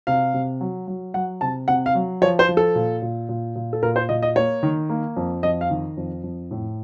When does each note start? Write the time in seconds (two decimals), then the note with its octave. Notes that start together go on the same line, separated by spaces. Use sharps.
0.07 C3 F5
0.34 C3
0.61 F#3
0.87 F#3
1.14 F#3 F#5
1.41 C3 A5
1.68 C3 F#5
1.86 F5
1.95 F#3
2.22 F3 C#5
2.39 C5
2.48 F3
2.57 A4
2.75 A#2
3.02 A#2
3.29 A#2
3.56 A#2
3.73 A4
3.82 A#2 A#4
3.96 C5
4.09 A#2 D#5
4.22 D#5
4.36 A#3 C#5
4.63 D#3
4.89 A#3
5.16 F2
5.43 F2 D#5
5.61 F5
5.70 D#3
5.97 F2
6.23 F2
6.51 A2